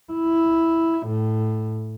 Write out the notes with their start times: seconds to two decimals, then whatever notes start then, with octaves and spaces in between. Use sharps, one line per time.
0.13 E4
1.07 A2